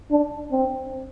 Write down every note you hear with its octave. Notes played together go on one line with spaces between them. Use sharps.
D4
C4